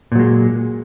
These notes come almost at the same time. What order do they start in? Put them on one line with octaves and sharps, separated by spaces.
A#2 F#3 G#3